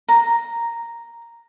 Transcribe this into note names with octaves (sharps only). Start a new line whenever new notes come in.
A#5